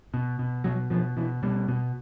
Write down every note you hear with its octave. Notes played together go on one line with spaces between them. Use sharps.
B2
B2
B2 F#3
B2 F3
B2 E3
B2 G3
B2